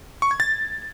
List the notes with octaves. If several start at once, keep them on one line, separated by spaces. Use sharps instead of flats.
C#6
G#6
A6